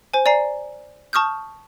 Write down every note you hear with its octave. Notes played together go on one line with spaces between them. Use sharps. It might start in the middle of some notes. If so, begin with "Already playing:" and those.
C5 G#5
D5 G#5 A#5 C7
A5 C#6 D#6 F6 G6